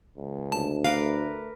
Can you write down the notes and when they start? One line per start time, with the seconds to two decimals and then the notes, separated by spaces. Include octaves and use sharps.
0.17 C#2
0.52 D2 A5
0.84 A3 A#4 B4 F5 D6